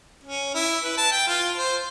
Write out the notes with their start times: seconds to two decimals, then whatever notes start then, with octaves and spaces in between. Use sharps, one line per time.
0.23 C#4
0.54 E4
0.83 B4
0.98 A5
1.12 G5
1.27 F4
1.57 C5